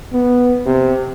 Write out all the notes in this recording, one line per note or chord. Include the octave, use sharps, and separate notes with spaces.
B3
C3